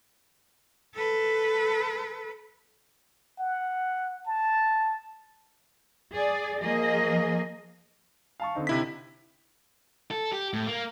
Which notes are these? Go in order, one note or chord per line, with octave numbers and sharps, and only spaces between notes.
A4 B4
F#5
A5
G#4 D5
F3 A#3 G#4 D#5
F5 A5 C#6
D3 C4 D#4
C3 E4 B6
A4
G4
A2
A#3